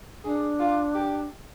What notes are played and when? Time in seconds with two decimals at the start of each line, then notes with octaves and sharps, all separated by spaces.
0.24 D4 G#4
0.60 F4
0.95 G4